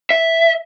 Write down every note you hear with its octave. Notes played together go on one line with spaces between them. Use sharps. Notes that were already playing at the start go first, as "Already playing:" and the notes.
E5